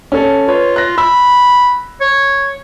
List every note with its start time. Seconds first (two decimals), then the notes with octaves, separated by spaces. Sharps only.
0.12 C#4 A4
0.48 F4 B4 C#5
0.76 F#6 A#6
0.98 B5 E6
2.01 C#5